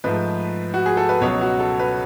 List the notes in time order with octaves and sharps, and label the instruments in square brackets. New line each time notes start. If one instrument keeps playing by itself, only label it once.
[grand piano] G#2 F3 A3 B4
F#4
G#4
A4
B4
C#2 B2 F#3 B3 C#5
F#4
A4
B4